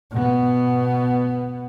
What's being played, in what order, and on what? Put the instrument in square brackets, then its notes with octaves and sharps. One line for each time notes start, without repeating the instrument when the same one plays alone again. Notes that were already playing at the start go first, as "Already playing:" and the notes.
[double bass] B2 B3